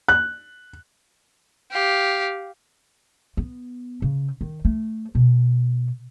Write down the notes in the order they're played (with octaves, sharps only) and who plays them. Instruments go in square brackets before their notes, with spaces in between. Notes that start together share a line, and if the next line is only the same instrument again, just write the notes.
[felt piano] F#6
[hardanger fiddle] G4 F5
[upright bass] B3
C#3
D#3
A3
B2